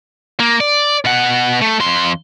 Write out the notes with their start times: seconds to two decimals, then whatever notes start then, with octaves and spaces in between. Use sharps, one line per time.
0.40 A#3
0.61 D5
1.05 B2 F#5
1.61 A3
1.80 F2 C6